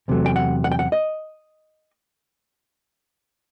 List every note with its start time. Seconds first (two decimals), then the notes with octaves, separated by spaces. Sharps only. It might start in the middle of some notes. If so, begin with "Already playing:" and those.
0.08 E2 C3 F#3 A3
0.26 G5
0.36 F#5
0.64 F#5
0.72 G5
0.79 F#5
0.92 D#5